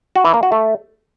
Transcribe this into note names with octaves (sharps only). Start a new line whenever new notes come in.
F#4
E3
A#3
F#4
A3